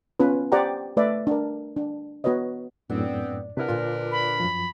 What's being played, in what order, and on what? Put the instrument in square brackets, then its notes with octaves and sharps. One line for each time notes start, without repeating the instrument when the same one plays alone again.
[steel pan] B3 C#4 F4 B4
G4 C5 D5 F#5 G5 A#5
A3 B4 D5 E5
D4 A#4
D4
B3 F#4 B4 C#5 D#5
[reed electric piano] F#2 A2 [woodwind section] B3 C4 [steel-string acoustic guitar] D4
[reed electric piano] C3 E4 F#5 [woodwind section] D4 A#4 B4
[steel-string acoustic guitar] A#2 D3 C5 [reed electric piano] F4
[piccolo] B5
[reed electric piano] F#2 F3